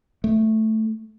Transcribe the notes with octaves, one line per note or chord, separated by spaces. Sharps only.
A3